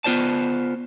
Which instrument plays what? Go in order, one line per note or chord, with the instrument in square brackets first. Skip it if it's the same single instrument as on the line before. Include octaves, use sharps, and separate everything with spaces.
[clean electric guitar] B3 F4 C5 D5 A5